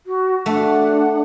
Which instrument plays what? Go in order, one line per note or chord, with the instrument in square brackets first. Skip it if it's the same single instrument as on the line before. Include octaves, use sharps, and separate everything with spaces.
[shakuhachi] F#4
[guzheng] A3 [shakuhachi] D4 [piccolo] F#5